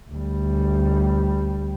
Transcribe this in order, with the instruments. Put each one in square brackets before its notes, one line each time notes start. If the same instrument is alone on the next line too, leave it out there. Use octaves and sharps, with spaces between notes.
[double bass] D2 G3